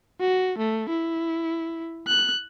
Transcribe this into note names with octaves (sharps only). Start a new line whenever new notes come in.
F#4
A3
E4
F#6